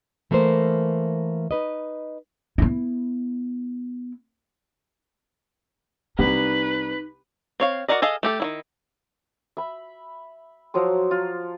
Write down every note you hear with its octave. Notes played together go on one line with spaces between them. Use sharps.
E3 A3 A#3 A#4 C5
D#4 B4 D#5
B3 E4
C2 D#4 B4
C4 C#5 F5
F#4 G#4 A#4 D5 D#5
G#4 A4 D#5 F5
A3 G4 A4
D#3 F#3 E4
E5 B5
F3 F#3 A#5 C6
F4